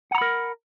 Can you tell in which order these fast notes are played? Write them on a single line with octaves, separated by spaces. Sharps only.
F#5 A#5 B5 A#4